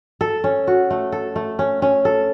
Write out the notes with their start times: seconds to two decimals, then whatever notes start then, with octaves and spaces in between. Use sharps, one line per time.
0.21 A4
0.44 C#4
0.67 F#4
0.90 A3
1.12 A4
1.36 A3
1.59 C#4
1.82 C#4
2.05 A4